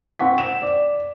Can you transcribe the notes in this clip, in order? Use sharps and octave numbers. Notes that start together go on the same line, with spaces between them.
C4 F#5 C#6 B6
E7
D5